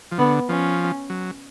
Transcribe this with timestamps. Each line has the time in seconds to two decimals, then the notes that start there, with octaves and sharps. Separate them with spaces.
0.11 F3
0.18 D3 B3
0.49 F3 C#4
1.10 F#3